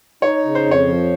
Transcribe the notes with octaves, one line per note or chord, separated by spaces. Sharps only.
D#4 C#5
C#3
C5
F2
C#5
F3